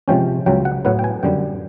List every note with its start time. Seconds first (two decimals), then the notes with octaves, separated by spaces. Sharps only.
0.08 C3 F3 G#3 C#4 G5
0.46 C#2 C#3 F#3 G5
0.65 F#5
0.85 A2 F#3 B3 F#5
0.99 G5
1.04 G#5
1.23 F#2 D3 G3 G5